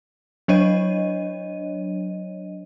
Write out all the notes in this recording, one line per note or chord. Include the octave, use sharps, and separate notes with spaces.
F#3 D4 C#5 D#5 D#7